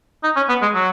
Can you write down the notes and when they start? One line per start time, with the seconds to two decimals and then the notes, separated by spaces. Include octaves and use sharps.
0.24 D#4
0.36 C#4
0.49 B3
0.62 G#3
0.74 F#3